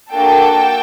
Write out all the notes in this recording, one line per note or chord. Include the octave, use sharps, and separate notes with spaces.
A#3 D4 F#4 A4 G5 A5